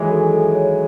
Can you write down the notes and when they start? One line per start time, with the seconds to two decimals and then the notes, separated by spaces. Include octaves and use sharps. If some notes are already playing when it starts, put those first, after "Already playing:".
Already playing: D#3 E3 F#3 G#3 A4 C#5 E5
0.11 A4
0.32 A4
0.55 C#5